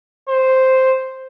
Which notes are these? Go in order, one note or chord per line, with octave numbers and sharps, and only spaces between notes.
C5